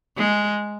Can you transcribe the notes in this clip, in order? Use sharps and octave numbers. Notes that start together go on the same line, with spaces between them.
G#3